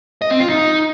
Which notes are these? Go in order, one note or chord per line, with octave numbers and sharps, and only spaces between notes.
D#5
C4
F4
D#4